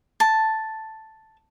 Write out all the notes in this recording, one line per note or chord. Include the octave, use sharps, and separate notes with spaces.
A5